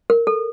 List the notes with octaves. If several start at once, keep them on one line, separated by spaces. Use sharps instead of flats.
A#4
A4